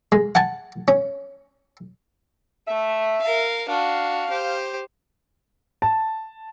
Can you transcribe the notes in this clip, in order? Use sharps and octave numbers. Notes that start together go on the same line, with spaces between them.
G#3
F#5 G#5 A5
C#4
A3 E5
A#4 F5
D4 F#4 F5
G4 C5
A5